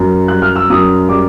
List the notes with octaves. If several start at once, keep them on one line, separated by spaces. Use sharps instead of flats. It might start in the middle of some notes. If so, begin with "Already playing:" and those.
Already playing: F#2
G3 F#6
F6
E6
F#2 D#6
G3 D6